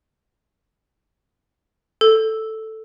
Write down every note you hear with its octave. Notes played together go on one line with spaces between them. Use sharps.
A4